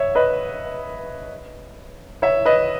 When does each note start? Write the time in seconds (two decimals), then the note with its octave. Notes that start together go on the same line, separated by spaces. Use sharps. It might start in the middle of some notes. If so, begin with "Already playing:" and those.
Already playing: C#5 E5
0.15 B4 D#5
2.22 C#5 E5
2.45 B4 D#5